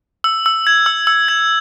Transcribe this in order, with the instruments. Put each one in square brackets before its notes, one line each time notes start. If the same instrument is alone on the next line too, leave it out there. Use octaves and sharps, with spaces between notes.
[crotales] E6
E6
G#6
E6
E6
G#6